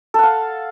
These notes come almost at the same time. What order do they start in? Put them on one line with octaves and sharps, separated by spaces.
A4 F#5 F5